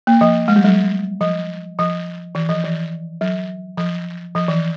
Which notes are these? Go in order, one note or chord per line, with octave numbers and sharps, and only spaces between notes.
A#3
F3
G#3
G3
F#3
F3
F3
E3
F3
E3
F#3
F3
F3
E3